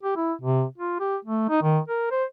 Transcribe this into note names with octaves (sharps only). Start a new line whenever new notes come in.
G4
E4
C3
F4
G4
A3
D#4
D#3
A#4
C5